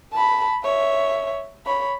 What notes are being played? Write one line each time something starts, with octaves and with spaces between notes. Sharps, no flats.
A5 B5
C#5 E5
C#5 B5